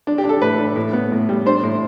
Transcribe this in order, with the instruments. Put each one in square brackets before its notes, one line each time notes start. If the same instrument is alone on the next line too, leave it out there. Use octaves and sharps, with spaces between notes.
[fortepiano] D4
G4
D4
A4
A2 B4
D4
A2
B3
A2
G3
D4 C5
A2